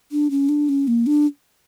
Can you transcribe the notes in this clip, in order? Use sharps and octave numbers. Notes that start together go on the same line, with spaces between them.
D4
C#4
D4
C#4
A#3
D4